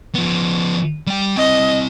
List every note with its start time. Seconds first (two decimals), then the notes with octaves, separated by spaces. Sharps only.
0.15 F3 B3
1.07 G3 G5
1.37 C4 E4 D#5